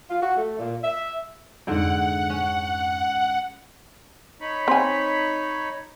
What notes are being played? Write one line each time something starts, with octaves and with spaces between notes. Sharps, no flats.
F4
F#4
A3
A#2
E5
F2 G#2 D3 F#5 G5
C#4
D#4 C#5 B5
C4 G#5